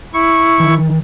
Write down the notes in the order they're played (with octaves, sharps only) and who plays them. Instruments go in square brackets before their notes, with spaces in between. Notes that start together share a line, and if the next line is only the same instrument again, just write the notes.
[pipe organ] E4 C#6
[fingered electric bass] D#3 E3